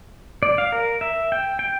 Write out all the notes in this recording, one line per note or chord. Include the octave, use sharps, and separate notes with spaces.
D5
F5
A#4
E5
G5
G5